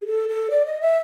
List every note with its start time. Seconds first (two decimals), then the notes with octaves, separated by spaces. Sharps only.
0.02 G#4
0.06 A4
0.29 A4
0.50 D5
0.66 D#5
0.81 E5